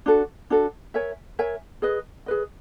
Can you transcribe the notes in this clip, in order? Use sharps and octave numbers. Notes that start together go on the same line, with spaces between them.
D4 F#4 A4
D4 F#4 A4
A#4 C#5 E5 G#5
A#4 C#5 E5 G#5
G#4 B4 D#5
G#4 B4 D#5